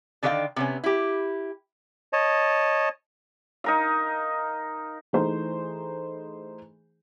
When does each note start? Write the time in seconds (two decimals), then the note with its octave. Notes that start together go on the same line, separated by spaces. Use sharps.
0.23 D3 D#3 D4 A#4 F5 G5
0.56 C3 B3 C#4
0.84 E4 G4
2.13 C#5 D#5 A5
3.64 D#4 A#4 F5
5.13 E3 A3 D#4 G#4 C5